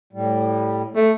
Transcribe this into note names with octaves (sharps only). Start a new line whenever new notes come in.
A2 G3
A3